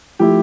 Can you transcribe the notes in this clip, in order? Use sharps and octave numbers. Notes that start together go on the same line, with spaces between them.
F3 A3 E4 G4